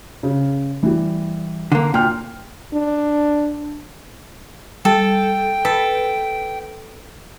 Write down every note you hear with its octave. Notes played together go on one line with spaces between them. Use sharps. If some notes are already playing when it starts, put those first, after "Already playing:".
C#3
E3 G3
D3 A#3
A#2 G5 F6
D4
G3 A4 G5
A4 B4